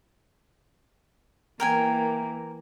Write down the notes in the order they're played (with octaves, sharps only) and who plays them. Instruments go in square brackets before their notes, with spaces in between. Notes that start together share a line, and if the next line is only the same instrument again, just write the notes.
[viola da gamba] E3 A#3 [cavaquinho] A#4 G5 G#5